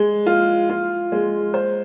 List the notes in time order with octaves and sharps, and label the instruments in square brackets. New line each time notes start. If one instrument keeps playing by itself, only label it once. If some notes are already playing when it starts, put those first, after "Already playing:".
Already playing: [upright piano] G#3
F4
F4
G#3
C5